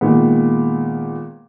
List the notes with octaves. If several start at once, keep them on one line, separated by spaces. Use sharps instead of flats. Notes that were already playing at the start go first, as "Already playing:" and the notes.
A#2 D#3 G#3 B3